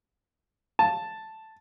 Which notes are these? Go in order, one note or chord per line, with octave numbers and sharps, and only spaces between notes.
A5